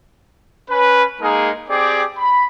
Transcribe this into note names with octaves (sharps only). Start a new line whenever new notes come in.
C#4 B4
G#3 A#3 D#4 G#4 A#4
C4 G4 G#4 D5 D6
B5